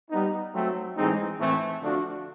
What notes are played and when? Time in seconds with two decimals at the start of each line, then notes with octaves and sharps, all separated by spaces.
0.10 G3 B3 D#4
0.53 F#3 A3 C4
0.95 A2 E3 G#3 C4 D#4
1.38 A2 E3 A3 C4
1.81 D3 F3 A3 D4 F#4